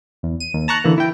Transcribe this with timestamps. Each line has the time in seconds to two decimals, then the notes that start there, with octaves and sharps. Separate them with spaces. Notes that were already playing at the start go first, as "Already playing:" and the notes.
0.23 E2
0.40 D#7
0.54 D#2
0.68 A5 A#5 C#6 F#6
0.84 D3 E3 A#3
0.98 E4 G5